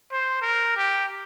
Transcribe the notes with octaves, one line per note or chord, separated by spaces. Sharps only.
C5
A#4
G4